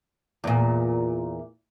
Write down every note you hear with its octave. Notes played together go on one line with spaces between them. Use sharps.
E2 A#2